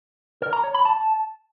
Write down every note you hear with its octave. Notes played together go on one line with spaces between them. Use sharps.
A#4
A#5
C#5
B5
A5